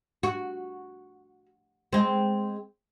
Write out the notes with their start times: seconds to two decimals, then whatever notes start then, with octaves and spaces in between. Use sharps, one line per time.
0.23 F#4
1.93 G#3 C4